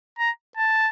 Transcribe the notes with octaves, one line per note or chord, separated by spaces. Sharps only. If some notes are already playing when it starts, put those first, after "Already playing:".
A#5
A5